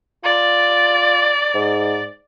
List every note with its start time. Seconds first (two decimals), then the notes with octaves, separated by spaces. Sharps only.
0.24 F4 D5
1.54 G#2